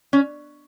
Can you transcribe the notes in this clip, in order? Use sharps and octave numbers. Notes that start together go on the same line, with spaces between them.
C#4